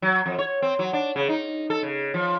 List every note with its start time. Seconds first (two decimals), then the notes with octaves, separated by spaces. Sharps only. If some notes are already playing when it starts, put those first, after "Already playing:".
0.02 F#3
0.26 F2
0.39 C#5
0.62 C4
0.79 F#3
0.93 D4
1.16 C#3
1.29 D#4
1.70 A4
1.83 C#3
2.14 F3